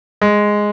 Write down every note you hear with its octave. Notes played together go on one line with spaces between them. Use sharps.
G#3